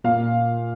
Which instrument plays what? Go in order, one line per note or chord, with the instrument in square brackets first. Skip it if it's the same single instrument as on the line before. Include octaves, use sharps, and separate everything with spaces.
[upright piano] A#2 F5